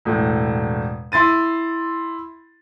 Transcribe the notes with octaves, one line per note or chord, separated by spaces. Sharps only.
E1 A2
E4 C6 A6 D#7